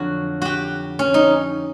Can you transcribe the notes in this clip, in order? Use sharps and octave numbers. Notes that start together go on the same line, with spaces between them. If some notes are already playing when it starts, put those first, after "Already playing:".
Already playing: F2 D3 F#3 F#4
F#4 G4
C#4
D#4